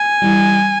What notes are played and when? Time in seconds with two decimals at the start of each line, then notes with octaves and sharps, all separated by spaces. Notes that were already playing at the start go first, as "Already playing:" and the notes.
Already playing: G#5
0.22 E3 G3